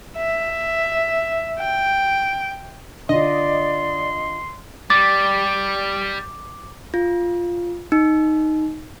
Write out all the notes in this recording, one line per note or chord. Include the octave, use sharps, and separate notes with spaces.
E5
G5
D3 F4 D5 D#5 C6
G3 D6 A6
F4
D#4